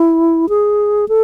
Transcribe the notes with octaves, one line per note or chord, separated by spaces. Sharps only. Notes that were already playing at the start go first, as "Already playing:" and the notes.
Already playing: E4
G#4
A4